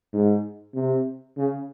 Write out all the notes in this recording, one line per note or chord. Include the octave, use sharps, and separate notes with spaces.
G#2
C3
C#3